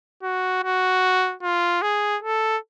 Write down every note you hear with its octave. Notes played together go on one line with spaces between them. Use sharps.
F#4
F#4
F4
G#4
A4